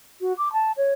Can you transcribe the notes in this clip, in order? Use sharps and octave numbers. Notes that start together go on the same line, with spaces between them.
F#4
D6
A5
C#5